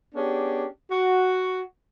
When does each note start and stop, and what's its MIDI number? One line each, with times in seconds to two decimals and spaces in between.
0.15 0.66 59
0.15 0.66 61
0.15 0.66 62
0.15 0.66 67
0.15 0.66 68
0.91 1.61 66